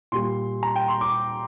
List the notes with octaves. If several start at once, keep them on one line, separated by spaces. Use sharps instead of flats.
A#2 G3 C6
A#5
G5
C6
D6